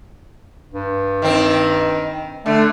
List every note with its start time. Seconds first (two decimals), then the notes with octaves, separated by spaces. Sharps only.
0.73 G2
1.22 D#3 C4
2.46 D3 A3